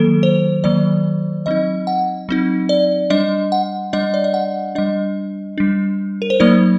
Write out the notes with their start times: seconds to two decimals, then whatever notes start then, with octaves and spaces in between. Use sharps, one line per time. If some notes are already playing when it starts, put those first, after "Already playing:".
Already playing: D#3 F#3 A#3 A4
0.23 C5
0.64 D#3 F#3 A#3 D5
1.46 F#3 C4 D#4 D#5
1.87 F#5
2.29 F#3 C4 D#4
2.69 D5
3.10 G3 D4 D#5
3.52 F#5
3.93 G3 D4 D#5
4.14 D5
4.24 D#5
4.34 F#5
4.75 G3 D4 D#5
5.58 G3 D4
6.22 A#4
6.30 C5
6.40 F#3 A#3 D#4 D5